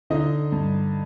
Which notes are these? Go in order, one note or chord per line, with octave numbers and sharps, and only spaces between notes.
D3 D#4 D#5
G2